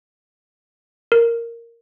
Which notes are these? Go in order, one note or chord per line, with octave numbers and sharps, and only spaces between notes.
A#4